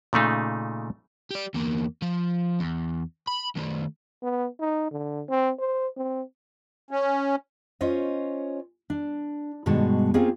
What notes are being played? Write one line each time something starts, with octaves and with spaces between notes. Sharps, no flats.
A#2 C#3 A3 D#4
G4 D5
E2 A#3
F3
E2
B5
D#3 A3
B3
D#4
D3
C4
C5
C4
C#4
C#4 F4 C5 C#5 D#5
D4
G2 B2 D#3 G#3 F#4 A5
A#3 C4 C#4 F4 G#4 C5